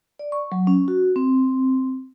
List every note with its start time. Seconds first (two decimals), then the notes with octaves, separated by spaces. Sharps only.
0.19 D5
0.32 C#6
0.52 F#3
0.67 C#4
0.88 F#4
1.16 C4